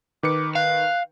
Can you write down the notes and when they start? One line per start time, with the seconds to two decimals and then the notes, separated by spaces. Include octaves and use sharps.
0.23 D#3 B4 D6 C#7
0.55 F5 F#6